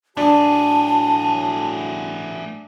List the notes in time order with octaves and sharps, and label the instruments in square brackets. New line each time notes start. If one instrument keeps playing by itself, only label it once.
[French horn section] A2 F#3 F#4 [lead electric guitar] A3 G#4 [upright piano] D4 [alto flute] A5